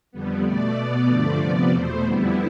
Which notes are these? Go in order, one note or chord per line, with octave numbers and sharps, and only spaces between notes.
F2 D3 G3 B3
B2 A3 D5
B2 B3
G2 D3 F3 A3 D5
C3 F3 B3 D5
E2 B2 A3 C5
F2 D3 G3 B3 E4